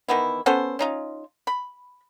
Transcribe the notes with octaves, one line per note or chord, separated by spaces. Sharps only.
D#3 E3 B3 E4
B3 C#4 A4 C5
C#4 D#4 F4
B5